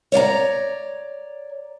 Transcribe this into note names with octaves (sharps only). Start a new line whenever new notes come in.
C#5 D5 F5 A#5